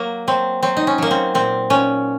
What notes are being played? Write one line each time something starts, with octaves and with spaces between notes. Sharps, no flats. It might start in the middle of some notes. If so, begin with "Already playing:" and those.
Already playing: F#3 A#3
F#3 C4
F#3 C4
D#4
C#4
F#3 A#3
C4
A#2 C4
A#2 C#4